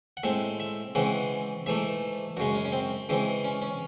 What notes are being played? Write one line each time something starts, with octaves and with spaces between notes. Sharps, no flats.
F#5
A2 G#3 C4 E5
E5
C#3 E3 G#3 C4 F#5
G#2 E3 A3 E5
F#2 C#3 G#3 F#4
C#4
C#4
C4
C#3 E3 G#3 C4
C#4
C#4